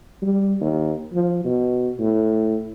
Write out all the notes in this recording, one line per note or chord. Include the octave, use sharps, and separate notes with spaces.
G3
D#2
F3
B2
A2